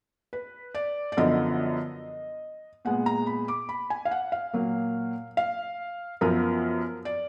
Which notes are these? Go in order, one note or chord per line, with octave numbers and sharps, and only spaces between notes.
B4
D5
D5
F#2 D3 F3 B3 D#5
A#2 G#3 B3 F#5
A#5
B5
D6
B5
G#5
F5
F#5
F5
A#2 F#3 A#3
F5
F#2 F3 B3 A#4
D5